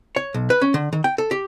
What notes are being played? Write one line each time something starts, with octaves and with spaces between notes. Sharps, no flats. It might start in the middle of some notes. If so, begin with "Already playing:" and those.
C#5
B1
B4
C#4
D3
D#3
G5
A4
G4